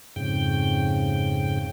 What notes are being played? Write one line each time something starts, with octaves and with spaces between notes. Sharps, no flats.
F2 G#2 C#3 G5